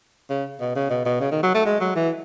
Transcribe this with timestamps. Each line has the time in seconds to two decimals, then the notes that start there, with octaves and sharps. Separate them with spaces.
0.30 C#3
0.60 B2
0.75 C#3
0.90 B2
1.05 B2
1.20 C#3
1.31 D#3
1.43 F#3
1.54 A3
1.66 G#3
1.80 F#3
1.96 E3